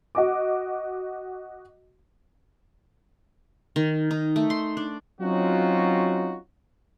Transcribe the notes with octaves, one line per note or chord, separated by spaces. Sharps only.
F#4 D#5 D6
D#3
D#4
A3
C6
D4
F#3 C4 C#4 D#4 F4 F#4